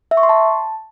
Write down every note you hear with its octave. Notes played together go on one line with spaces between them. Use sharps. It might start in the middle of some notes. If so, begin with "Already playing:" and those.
E5
C#6
C6
A5